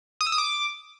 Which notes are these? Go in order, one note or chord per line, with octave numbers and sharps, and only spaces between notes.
D#6
E6
D#6
D6